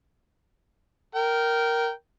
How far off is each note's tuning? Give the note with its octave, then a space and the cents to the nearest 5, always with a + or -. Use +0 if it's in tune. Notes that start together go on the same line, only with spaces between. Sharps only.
A#4 +0 G5 -20